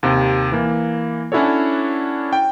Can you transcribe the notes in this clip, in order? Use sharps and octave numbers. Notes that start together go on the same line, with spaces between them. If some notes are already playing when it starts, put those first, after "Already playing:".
D#2 C3
E3 A#3
C#4 D4 E4 F#4 A4 C#5
G5